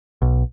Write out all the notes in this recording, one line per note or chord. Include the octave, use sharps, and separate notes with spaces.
B1